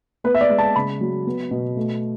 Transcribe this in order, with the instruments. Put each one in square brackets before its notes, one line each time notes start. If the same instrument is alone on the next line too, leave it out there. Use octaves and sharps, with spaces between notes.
[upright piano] B3 B4
E5
D5
G#3
A5
C#3 B5
F#3
B3
B2
A3